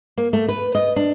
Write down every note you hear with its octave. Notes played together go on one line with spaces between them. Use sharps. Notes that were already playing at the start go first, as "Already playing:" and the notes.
A#3
A3
B4
D#5
D4